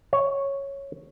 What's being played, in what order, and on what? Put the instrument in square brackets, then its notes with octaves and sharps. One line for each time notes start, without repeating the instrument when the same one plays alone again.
[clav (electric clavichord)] C#5